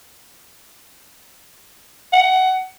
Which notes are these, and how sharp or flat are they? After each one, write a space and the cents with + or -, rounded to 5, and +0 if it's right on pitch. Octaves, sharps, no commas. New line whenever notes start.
F#5 +20